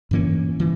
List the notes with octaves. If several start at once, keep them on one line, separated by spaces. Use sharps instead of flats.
G2 E3 A#3 C#4
E3